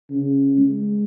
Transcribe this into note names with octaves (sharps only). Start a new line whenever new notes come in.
C#3
G#3